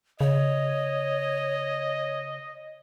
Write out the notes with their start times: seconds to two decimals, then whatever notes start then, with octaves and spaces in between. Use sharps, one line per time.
0.21 C#3 C#5 D#5